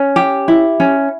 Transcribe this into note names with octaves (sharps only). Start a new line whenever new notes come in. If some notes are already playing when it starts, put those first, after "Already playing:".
Already playing: C#4
G4
E4
C#4